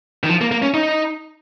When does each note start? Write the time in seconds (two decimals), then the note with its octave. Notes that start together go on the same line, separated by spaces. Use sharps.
0.23 D#3
0.29 F3
0.41 A#3
0.52 A#3
0.62 C#4
0.74 D#4